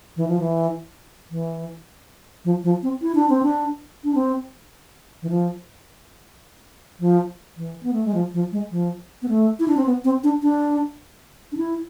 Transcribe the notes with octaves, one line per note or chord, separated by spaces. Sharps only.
E3
F3
E3
E3
F3
F3
C4
E4
D4
C4
D4
D4
C4
E3
F3
F3
E3
B3
A3
G#3
F3
F3
G#3
F3
B3
A3
E4
D4
C4
B3
C4
D4
D4
D4
E4